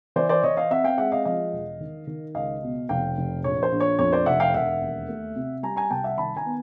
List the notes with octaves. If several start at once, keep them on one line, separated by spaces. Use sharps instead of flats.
E3 C5 D5
C5 D5
E3 C#5 D#5
D#5 F5
C4 E5 F#5
F5 G5
G#3 E5 F#5
D#5 F5
F3 D#5 F5
E1
D#3
D#3
C#2 D#5 F5
B2
F1 F5 G5
F1
A#1 C#5
C5
A#1
C#5
F2 C#5
C5 D5
F1 E5 F#5
F5 G5
E1 E5 F#5
D#2
A3
C3
G3 G#5 A#5
G#5 A#5
C2 G5 A5
E5 F#5
D#3 A5 B5
G#5 A#5
B3